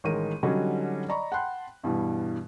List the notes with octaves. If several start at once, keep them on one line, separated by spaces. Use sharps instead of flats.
A1 D#3 G#3 A#4 D#7
D3 F#3 G3 C#4 D#4 F#4
D5 D#5 A#5 B5 C#6
F#5 G5 A5 B5 C6 F#6
G2 B2 E3 G3